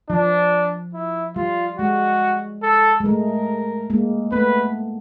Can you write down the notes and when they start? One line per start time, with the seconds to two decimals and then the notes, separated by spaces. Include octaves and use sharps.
0.10 F3 D4
0.94 E4
1.36 G3 F4
1.79 G#3 F#4
2.63 A4
3.00 G#3
3.05 A3 A#4
3.90 G#3 A#3
4.32 A3 B3 B4